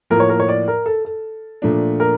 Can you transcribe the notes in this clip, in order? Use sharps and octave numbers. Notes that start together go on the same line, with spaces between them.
A2 F3 A#3 A#4
C#5
A#4
C#5
D5
A#4
A4
A4
A#2 F3 A3 D4
A#4